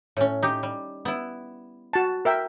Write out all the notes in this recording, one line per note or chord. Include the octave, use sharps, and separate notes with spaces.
A2 C#4
D#4 G4
G3
B3 E4
F#4 A5
A#4 E5 G5